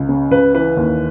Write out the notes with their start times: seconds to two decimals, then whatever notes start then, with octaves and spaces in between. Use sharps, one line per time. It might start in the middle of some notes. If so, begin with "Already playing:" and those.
Already playing: C#2
0.09 C#3
0.31 C#2 B4
0.54 E3 B4
0.77 D#2